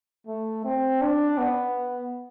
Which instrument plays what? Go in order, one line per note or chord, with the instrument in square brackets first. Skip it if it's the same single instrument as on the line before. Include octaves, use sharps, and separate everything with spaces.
[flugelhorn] A3
C4
D4
B3